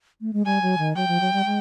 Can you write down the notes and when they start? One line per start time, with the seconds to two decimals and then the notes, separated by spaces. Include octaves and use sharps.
0.21 A3
0.33 G#3
0.45 G3 G#5
0.62 F#3
0.78 D#3
0.96 F#3 G5
1.08 F3
1.21 F#3
1.33 G3
1.46 G#3